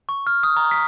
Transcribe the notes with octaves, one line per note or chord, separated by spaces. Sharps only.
C#6
F6
D#6
A#5
B6